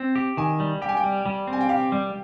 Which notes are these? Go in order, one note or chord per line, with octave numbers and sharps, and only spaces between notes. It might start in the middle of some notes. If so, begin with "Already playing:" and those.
Already playing: C4
G4
D#3 G#5
G3
G4 G5
G#5
G5
G3
G3
C4
G#5
G5
G4 F5
G3